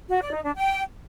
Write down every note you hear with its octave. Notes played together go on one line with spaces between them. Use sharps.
F#4
D5
D#4
D4
G5